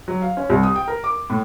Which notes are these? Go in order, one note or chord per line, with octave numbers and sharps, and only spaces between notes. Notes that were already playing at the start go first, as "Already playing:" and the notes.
F#3
F5
C#4
C2
D#6
G5
A#4
D6
A2